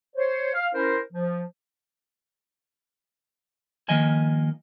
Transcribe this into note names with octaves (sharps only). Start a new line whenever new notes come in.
C5 C#5
F5
C#4 E4 A#4 C5
F3
D#3 F3 A#3 D#5 G#5